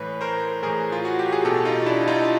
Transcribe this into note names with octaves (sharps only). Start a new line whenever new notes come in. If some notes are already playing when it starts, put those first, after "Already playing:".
Already playing: A2 E3 B4 C#5
A#4 C5
A2 E3 G#4 A#4
F4
F#4
G4
G#4
B2 G4 A4
D#4 F4
D4 E4
D#4 F4